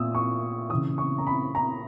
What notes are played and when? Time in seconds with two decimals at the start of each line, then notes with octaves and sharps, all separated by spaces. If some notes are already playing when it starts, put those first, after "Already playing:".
Already playing: A#2 D#6 E6
0.15 C#6
0.70 C#3 E3 D#6
0.98 C#6
1.18 A#5
1.27 B5
1.55 A#5